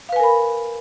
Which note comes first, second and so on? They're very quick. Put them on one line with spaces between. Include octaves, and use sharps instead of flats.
F5 B4 G#5 A#4 B5